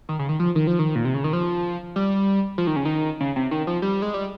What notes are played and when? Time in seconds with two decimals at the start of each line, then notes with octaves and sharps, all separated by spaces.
0.09 D#3
0.19 C#3
0.29 D#3
0.39 F3
0.55 D#3
0.67 F3
0.79 D#3
0.95 A#2
1.05 C3
1.14 C#3
1.24 D#3
1.33 F3
1.96 G3
2.58 F3
2.67 D#3
2.76 C#3
2.85 D#3
3.20 C#3
3.36 C3
3.51 D#3
3.67 F3
3.82 G3
4.02 G#3
4.14 G3